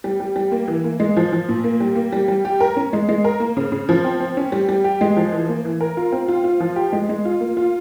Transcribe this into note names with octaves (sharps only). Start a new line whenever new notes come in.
G3
G3
G3
A#3
E3
A#3
G#3
F3
F3
A#2
A#3
G3
A#3
G3
G3
G4
A#4
C#4
G#3
G#3
A#4
A#3
C#3
C#3
F3
C4
C4
C#4
G3
G3
G4
G#3
F3
E3
A#3
E3
A#4
F4
C4
F4
F4
F3
G4
G#3
G#3
F4
A#3
F4